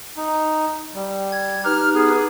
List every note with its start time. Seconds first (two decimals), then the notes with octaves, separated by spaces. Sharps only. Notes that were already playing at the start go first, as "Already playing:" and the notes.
0.17 D#4
0.95 G3
1.32 G#6
1.65 D#4 G4 B4 F6
1.94 B3 G#4